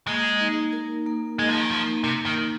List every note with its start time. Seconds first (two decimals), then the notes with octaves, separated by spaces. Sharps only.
0.07 G#3 A#3
0.40 D#4
0.73 A#4
1.06 A#3
1.39 G#3 A#3
1.49 F3
1.61 D#3
1.71 F3 D#4
2.04 C3 A#4
2.26 D#3
2.37 A#3